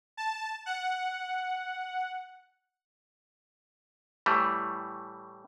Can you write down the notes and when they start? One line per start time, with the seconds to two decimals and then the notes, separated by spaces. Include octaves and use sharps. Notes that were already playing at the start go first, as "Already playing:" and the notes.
0.17 A5
0.66 F#5
4.26 A2 E3 G3 A3